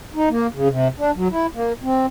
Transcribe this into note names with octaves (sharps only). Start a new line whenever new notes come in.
D#4
A#3
C#3
C3
D4
F#3
E4
A#3
C4